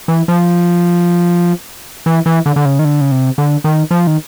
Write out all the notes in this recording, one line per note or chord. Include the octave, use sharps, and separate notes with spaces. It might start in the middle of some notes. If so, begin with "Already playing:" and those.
E3
F3
E3
E3
D3
D3
C#3
D#3
D3
C#3
C3
D3
D#3
F3
D#3